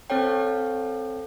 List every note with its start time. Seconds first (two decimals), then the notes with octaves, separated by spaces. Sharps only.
0.10 C4 A4 C#5 G5